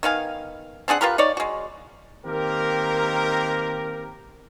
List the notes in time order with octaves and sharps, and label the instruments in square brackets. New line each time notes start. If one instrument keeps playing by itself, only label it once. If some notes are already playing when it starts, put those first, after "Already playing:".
[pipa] D#3 B3 F5 G#5
C4 D4 G#4 F#5
F4 G4 A#4 B4
D#4 C#5 D5
G#3 F#4
[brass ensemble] D#3 A#3 C4 G4 A#4